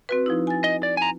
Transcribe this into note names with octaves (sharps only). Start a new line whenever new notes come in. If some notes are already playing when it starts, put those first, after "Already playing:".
C4 F#4 B4
F3 D#4 E4
G#5 A6
D#5
D5
G#5 A#5